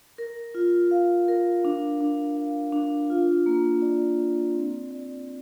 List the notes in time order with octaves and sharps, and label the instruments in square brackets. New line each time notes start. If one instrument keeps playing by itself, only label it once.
[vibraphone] A#4
F4
F5
A#4
D4
D4
F5
D4
F4
A#3
D5
D5
C4
D5